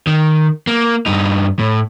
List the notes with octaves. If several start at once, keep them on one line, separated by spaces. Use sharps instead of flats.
D#3
A#3
G2 D#4
A2